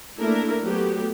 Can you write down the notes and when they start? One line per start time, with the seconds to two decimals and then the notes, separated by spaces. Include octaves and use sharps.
0.18 A3 A#3 D4 E4 A#4
0.62 F#3 A3 B3 G4